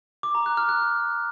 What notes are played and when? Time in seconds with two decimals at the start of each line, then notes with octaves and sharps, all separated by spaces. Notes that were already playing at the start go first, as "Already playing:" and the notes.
0.23 D6
0.35 A#5
0.46 F#6
0.57 F6
0.69 F#6